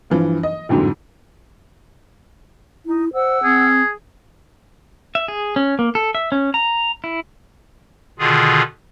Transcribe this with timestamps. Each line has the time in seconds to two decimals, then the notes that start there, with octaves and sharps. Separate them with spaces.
0.10 G2 E3 F3
0.43 D#5
0.69 A1 F2 G#2 D3 F#3
2.86 D#4 E4
3.13 C5 D5 F#5 E6
3.44 C4 G#4
5.15 E5
5.28 G#4
5.56 C#4
5.79 A#3
5.95 A4
6.15 E5
6.32 C#4
6.54 A#5
7.04 E4
8.19 B2 D3 D#3 F4 G#4